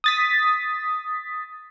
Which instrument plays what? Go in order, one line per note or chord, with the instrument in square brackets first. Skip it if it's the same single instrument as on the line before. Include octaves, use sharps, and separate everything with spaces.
[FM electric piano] D#6 A6 B6